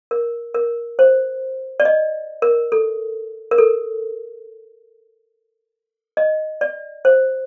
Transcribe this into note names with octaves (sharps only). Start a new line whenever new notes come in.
A#4
A#4
C5
D5
D#5
A#4
A4
A#4
A4
D#5
D5
C5